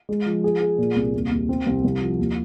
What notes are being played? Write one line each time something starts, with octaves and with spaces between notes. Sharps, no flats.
G#3
F3
G#4
G#4
A#2
C2
D#2
D#2
C4
C2
C2
F3
D#2